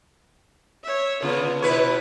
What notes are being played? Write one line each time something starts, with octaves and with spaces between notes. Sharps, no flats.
C#5 E5
C#3 B3 F4
B2 E4 B4 C#5